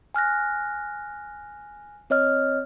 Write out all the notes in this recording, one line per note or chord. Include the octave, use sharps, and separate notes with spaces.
G#5 F6 F#6 A#6
C4 C#5 D#5 F6